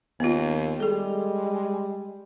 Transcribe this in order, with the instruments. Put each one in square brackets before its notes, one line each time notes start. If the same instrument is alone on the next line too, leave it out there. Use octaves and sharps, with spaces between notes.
[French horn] D#2 [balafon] B3 F4
[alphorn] G3 [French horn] G#3 [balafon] G#4 A4